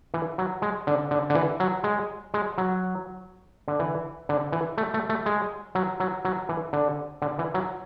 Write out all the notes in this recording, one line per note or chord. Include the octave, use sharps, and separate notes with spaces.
E3
F#3
G#3
D3
D3
D3
E3
F#3
G#3
G#3
F#3
D3
E3
D3
E3
A3
A3
A3
G#3
F#3
F#3
F#3
E3
D3
D3
E3
F#3